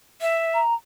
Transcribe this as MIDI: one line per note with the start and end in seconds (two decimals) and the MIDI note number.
0.21 0.60 76
0.54 0.74 82